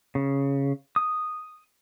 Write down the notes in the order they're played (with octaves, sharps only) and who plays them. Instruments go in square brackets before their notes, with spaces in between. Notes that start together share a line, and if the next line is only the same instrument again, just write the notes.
[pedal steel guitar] C#3
D#6